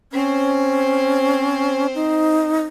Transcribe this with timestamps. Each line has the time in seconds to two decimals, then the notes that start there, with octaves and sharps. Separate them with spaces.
0.13 C4 C#4 C5
1.95 D#4